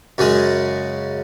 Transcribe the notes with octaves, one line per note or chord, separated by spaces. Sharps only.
F#2 C#3 G#3 C#4